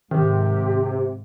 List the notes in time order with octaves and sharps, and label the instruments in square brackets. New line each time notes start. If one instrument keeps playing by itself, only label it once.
[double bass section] G#2 [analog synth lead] C3 [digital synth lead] D#3 [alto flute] G4